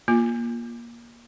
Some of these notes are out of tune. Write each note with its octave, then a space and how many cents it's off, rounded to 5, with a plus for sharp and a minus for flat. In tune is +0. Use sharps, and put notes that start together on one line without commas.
A#3 +20 F4 +10